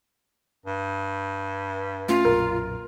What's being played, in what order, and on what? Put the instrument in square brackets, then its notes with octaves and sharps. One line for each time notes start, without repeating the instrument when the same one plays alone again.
[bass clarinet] G2
[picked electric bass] A3 C#4 [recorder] F4
[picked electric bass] B1 F#2 A#2 [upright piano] A#4